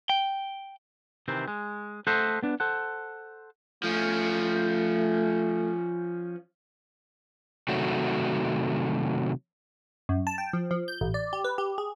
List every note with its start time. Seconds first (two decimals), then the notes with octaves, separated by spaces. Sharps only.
0.10 G5
1.28 C3 D#3 E3 C4
1.48 G#3
2.07 A3 A4 C5 D#5 E5 F#5
2.43 B3 D4
2.60 A4 C5 F#5
3.83 F3 A3 C#4
7.68 C3 D#3 F#3 A3 F#4
10.09 F#2
10.27 A5
10.38 G5
10.53 F3
10.71 F3
10.88 G6
11.01 A1
11.14 D5
11.33 G4
11.44 B4
11.58 G4
11.78 G#4